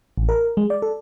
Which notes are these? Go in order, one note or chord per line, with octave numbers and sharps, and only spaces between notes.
A1
A#4
G#3
D5
A4